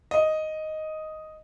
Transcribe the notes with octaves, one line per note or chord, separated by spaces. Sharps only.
D#5